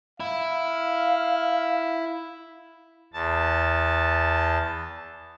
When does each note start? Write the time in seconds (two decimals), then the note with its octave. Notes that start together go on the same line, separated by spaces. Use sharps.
0.20 E4 F5
3.13 E2 A5